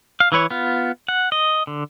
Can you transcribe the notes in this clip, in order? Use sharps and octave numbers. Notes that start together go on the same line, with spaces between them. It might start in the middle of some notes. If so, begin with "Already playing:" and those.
F5
E3 E4 B4 C#5
B3 F4
F#5
D#5
D3